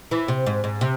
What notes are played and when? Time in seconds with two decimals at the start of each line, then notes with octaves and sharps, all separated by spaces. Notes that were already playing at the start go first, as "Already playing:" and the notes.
0.11 E3
0.28 C3
0.46 G#2
0.64 G#2
0.81 C3